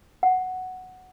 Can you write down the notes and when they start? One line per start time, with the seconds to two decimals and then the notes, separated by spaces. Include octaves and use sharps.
0.23 F#5